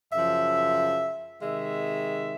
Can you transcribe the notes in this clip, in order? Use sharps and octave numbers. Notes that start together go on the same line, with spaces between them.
F#2 C#3 F3 E5
C3 D#3 G#3 E5